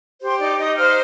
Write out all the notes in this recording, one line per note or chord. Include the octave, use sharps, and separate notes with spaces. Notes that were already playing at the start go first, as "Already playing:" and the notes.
G4 C5 C6
D#4 D5 D6
D#4 D#5 D#6
C5 F5 F6